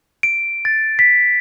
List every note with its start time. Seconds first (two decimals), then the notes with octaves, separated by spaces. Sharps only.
0.23 D7
0.65 A6
0.99 B6